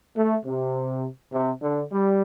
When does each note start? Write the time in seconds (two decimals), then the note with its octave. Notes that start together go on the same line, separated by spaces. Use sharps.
0.16 A3
0.45 C3
1.32 C3
1.62 D3
1.91 G3